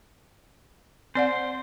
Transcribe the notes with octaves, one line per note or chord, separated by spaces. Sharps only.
C4 C5 D5 F#5